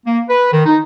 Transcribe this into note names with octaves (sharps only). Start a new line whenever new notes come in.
A#3
B4
D#3
D#4